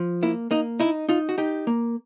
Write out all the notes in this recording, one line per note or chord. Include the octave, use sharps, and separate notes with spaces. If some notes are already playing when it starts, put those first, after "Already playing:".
Already playing: F3
A#3 E4
A#3 D#4
D#4 E4
D#4 F4
F#4
D#4 G4
A#3